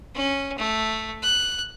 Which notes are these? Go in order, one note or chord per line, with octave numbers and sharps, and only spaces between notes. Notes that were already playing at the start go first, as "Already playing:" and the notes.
C#4
A3
F#6